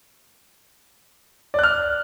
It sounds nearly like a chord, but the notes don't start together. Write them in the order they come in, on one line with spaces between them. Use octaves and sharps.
D5 F#6 F6